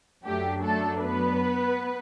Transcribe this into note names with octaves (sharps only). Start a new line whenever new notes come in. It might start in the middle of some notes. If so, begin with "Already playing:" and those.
F#2 F#3 A3 D4 G4
A3 A4
B3 B4